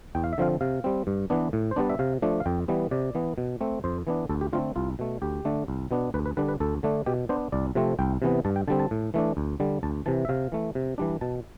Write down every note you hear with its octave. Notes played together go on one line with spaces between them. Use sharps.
E2 G5
F5
E5
D3 F3 C4 F5
C3 F5
G3 C4
G2
E3 B3 D4
A2
C5
G3 B3 D4 D5
E5
C3 F5
F3 A3 D4
F5
F2 G5
E3 G3 B3
C3 D5
E3 B3
B2
A3 C4
F2 C5
E3 B3 D4
D2 A4
G4
D3 A3 C4 F4
C2 F4
B2 A3
D2 G4
D3 A3 D4
C2
B2 B3 D4
D2 B4
B4
D3 G3 D4 B4
B4
D2 A4
D3 A3 D4
B2 G4
B3 D4 C5
C2 D5
C3 F3 A3 C4
C2 G5
C3 E3 B3
G2 A5
G5
D3 G3 C4 A5
A5
A2
E3 A3 D4
D2
D3 G3
D2 A5
C3 E3 A5
E5
C3 F5
E3 A3
C3
E3 G3 D4
B2 A5